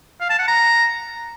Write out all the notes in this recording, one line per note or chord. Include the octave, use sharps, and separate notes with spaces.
F5
A5
F#5
A#5